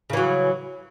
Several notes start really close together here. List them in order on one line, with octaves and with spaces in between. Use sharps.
C#3 E3 F#3